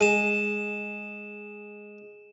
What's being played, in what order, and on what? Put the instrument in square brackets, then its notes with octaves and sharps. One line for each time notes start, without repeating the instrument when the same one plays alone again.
[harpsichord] G#3 [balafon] G#4 [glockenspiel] D#7 E7